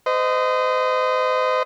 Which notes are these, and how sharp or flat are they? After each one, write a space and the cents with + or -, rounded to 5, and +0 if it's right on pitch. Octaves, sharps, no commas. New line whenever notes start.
C5 -40 D#5 +0